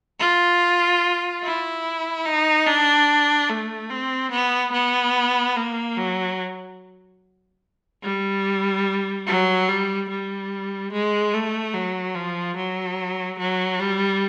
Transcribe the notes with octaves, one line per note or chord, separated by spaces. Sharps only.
F4
E4
D#4
D4
A3
C4
B3
B3
A#3
F#3
G3
F#3
G3
G3
G#3
A3
F#3
F3
F#3
F#3
G3